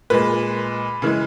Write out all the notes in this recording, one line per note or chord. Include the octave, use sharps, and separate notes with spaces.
A#2 G#3 B4
C#3 E3 G#3